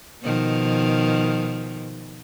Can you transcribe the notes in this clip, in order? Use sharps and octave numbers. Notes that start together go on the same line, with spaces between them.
B2 D#3 F3